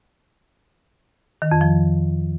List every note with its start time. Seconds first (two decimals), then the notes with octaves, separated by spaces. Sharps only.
1.42 D#3
1.51 F2
1.61 F3